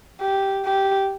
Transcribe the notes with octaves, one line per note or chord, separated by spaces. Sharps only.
G4
G4